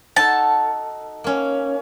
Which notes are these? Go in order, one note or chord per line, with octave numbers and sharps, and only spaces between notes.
D#4 F#4 A4 A5
A#3 C#4